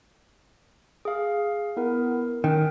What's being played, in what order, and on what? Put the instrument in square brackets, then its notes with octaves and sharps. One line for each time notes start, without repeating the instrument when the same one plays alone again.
[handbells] G#4 F5
B3 E4 A#4
[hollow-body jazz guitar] D#3 [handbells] C#4 A#4 G5